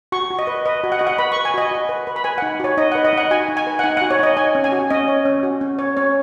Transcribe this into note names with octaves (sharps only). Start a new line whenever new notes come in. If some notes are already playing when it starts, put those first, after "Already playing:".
F#4 C#6
F#4
D#5
B4
B4 D#5
F#4
F#5
F#4 D#5
F#5
B4 B5
C#6
B4
G#5
F#4 D#5
F#4
B4
B4
B5
B4 G#5
F#5
D#4
F#4 C#5
D#4 D#5
F#5
B4
D#5
D#4 F#5
F#4 G#5
D#4
G#5
B4
F#5
D#4 G#5
F#5
F#4
C#5
D#4 D#5
C#5 G#5
C#4
G#5
F#4
C#4 D#5
C#5
C#4
F#4
C#4
C#5
C#4 C#5